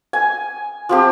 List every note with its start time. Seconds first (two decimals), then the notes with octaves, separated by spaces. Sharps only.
0.13 G#5
0.89 F3 C4 G4